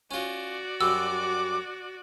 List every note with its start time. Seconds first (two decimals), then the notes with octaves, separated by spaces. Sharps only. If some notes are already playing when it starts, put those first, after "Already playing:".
0.11 C#4 F4 F#4 D5
0.81 F#2 G3 D6 E6